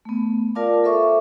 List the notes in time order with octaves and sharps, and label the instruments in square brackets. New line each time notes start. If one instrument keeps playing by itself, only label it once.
[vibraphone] A3 B3
F4 A#4 D5 F5 A5 D6
A4 C5 E5 C#6 D6